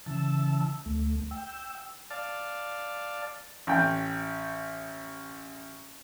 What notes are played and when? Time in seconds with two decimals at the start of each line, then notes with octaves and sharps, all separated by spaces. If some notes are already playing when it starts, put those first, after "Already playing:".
0.06 C#3 E3 A5 E6
0.86 D2 A3
1.31 G5 E6
2.10 D5 F5 A5
3.67 A1 G5